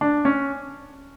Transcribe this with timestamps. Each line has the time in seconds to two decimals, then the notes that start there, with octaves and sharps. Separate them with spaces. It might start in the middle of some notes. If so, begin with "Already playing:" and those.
0.01 D4
0.25 C#4